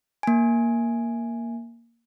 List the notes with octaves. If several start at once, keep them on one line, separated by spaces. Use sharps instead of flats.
A#3 G#5